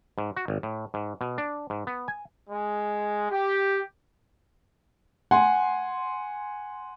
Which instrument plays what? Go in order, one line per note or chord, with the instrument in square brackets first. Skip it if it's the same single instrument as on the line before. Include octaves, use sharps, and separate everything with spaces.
[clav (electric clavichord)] G#2
F#4
G#1
A2
G#2
B2
D4
G#2
B3
G#5
[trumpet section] G#3
G4
[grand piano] F#5 G#5 C6